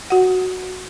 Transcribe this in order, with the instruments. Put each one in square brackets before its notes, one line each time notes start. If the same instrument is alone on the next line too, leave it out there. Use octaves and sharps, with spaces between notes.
[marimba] F#4 F#5